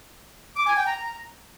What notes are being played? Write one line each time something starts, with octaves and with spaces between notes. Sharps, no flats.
D6
G#5
G5
A#5